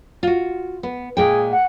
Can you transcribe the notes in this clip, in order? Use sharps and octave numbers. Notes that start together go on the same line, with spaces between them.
F4 F#4
B3
A#2 G#3 G#4 G5
F#5